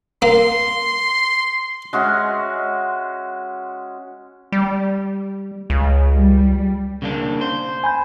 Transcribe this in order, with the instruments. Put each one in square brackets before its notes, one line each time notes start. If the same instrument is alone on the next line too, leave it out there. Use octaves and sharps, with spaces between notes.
[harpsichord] A#3 [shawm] C6
[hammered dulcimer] G#3 C#4 F#4 E5
[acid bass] G3
C#2
[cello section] G3
[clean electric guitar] C#3 A#3 D4
C5
[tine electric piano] G#5 B5 G6